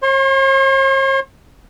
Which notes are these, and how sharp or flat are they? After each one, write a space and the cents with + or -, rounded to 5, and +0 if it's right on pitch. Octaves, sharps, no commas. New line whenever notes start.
C#5 -45 C6 +25